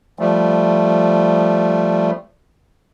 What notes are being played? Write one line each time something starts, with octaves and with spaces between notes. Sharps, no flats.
F3 G3 A3